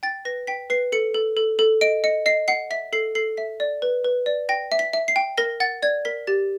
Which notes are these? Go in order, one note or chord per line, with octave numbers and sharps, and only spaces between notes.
G5 A6
B4 A#6
G5 B6
B4 C7
A4 C#7
A4
A4
A4
D#5 D7
D#5 C#7
D#5 C7
F#5 C7
E5 B6
A4 C7
A4 C7
E5 B6
D5
B4
B4
D5
G5 A#6
E5
B6
E5
C7
G5
A#4 A#6
F#5 A6
D5 G#6
A#4 B6
G4 A6